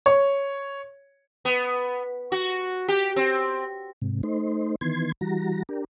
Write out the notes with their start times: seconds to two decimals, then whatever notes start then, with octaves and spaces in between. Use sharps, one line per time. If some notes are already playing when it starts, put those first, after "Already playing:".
0.06 C#5
1.45 B3
2.32 F#4
2.88 G4
3.16 C4
4.02 G#2 C3
4.23 A3 D#4 C5
4.81 D#3 E3 B3 C6 G#6
5.21 E3 G3 F#4 A#5
5.69 D4 G4 A#4